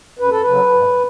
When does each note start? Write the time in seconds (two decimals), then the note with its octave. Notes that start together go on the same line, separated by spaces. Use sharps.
0.19 F#2 B4
0.31 A4
0.41 B4
0.47 C#3 F#3
0.73 G#2